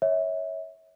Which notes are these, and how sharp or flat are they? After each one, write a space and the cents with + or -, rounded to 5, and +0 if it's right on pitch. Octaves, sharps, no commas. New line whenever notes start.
C#5 -5 E5 -25